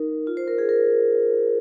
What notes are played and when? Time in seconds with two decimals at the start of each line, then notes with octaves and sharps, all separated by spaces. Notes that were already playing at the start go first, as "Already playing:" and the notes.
Already playing: D#4 A#4
0.27 F4
0.37 C5
0.48 A#4
0.58 G#4
0.69 A#4